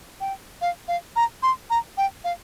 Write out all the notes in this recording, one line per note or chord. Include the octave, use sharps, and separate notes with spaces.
G5
F5
F5
A#5
C6
A#5
G5
F5